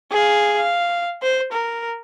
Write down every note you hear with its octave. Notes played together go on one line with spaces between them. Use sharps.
G#4 F5
F5
C5
A#4